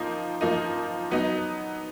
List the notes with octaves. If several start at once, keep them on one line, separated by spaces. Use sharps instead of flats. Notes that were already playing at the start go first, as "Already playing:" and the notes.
Already playing: F3 A#3 D#4
F3 A#3 D#4
F#3 B3 D#4